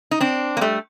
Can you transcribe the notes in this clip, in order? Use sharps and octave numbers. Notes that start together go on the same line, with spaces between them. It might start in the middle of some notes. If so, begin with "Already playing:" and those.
D#4
C4 D4
A#3
G3 A3